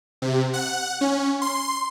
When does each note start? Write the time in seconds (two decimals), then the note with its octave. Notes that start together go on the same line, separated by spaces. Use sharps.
0.22 C3
0.54 F#5
1.01 C#4
1.41 C6